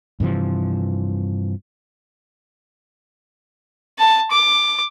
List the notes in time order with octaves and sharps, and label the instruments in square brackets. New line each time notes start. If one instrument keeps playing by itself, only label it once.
[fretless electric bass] G2 C3 E3 F3
[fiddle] A5
D6